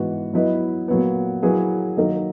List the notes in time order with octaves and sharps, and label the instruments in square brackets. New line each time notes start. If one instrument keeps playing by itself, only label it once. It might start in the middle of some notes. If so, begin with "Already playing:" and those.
Already playing: [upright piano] G#2 E3 B3 F#4
F#3 B3 E4 B4 D#5
A#2 F#3 B3
F#3 A#3 E4 G#4 B4
D#3 F#3 A#3 D#4 A#4